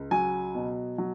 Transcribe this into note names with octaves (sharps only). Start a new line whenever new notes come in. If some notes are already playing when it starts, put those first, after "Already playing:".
Already playing: C#2
F#3 G#5
B2
F#3